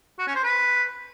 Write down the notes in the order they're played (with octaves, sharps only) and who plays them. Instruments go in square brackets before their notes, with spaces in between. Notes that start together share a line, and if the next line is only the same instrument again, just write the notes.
[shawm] F#4
C#4
C5
B4